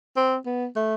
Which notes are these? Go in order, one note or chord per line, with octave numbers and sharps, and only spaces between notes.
C4
B3
A3